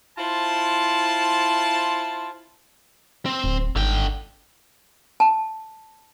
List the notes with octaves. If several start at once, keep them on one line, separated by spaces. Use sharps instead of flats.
E4 F4 C5 A5
C4
D1
G#1 D3 G5
A5